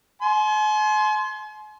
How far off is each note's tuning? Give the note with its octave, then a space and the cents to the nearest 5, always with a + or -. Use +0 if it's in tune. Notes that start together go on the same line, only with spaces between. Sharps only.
G#5 +45 C6 +0